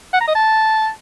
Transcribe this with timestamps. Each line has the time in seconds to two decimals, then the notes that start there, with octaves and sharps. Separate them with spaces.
0.13 F#5
0.21 A#5
0.28 D#5
0.35 A5